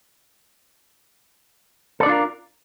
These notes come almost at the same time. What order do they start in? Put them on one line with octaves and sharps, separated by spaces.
A4 D5 D4 F4 A#4